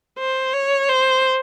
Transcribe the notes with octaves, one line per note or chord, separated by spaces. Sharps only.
C5
C#5
C5